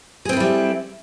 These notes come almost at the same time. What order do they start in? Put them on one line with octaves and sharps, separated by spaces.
G#4 C4 A4 E4 G3